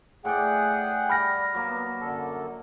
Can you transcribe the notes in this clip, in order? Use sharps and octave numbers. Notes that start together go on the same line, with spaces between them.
A2 G#4 D5 F#5 G5
G3 B5 F6 A#6
F#3 A#3
B3
F#2 D3 A4